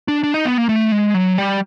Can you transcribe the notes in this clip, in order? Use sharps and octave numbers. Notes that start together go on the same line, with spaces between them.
D4
D4
D#4
B3
A#3
A3
G#3
F#3
G3